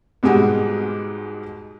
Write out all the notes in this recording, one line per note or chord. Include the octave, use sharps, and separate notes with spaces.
G#2 B2 G3 G#3 F#4 G4